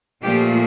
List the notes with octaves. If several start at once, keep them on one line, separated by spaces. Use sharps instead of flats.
A#2 F3 A3 G4